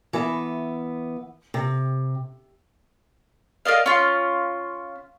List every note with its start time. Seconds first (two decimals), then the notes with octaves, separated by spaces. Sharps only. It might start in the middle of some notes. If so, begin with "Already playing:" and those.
0.13 E3 B3 E5
1.54 C3
3.65 A#4 D5 D#5 F5
3.86 C#4 F4